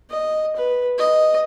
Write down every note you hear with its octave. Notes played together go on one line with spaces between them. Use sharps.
D#5
B4
D#5